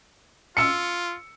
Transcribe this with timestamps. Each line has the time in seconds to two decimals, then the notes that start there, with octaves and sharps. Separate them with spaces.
0.57 F4 E6 C#7